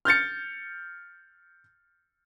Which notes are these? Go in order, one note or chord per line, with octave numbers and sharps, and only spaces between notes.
F6 G6 A6 C#7